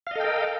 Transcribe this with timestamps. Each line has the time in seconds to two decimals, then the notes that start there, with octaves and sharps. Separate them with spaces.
0.07 F5
0.11 D#5
0.15 A4
0.20 G5
0.24 A#4